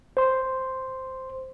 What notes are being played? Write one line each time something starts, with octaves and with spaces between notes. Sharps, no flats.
C5 C6